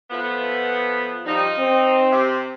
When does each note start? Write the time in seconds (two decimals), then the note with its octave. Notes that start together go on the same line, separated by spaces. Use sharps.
0.10 F3 A3 B3
1.26 F3 G3 D#4
1.58 C4
2.12 C3